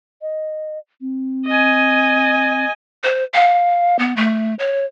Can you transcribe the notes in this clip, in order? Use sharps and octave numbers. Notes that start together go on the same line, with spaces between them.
D#5
C4
D#5 G#5
C5
F5
B3
A3
C#5